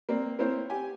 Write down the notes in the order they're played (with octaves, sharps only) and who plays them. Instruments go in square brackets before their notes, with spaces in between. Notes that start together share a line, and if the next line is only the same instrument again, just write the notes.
[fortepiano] A#3 C4 D5
A#3 C4 E4 C5 C#5
G4 G#5